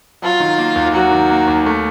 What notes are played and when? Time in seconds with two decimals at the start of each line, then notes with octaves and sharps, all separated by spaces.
0.22 F#3 F4
0.40 D#3
0.58 A#3
0.76 D#2
0.94 F#3 F#4
1.12 D#3
1.30 A#3
1.48 D#2
1.66 A3